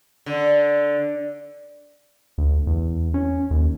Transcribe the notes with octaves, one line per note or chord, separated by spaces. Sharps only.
D3
D2
E2
C#4
D#2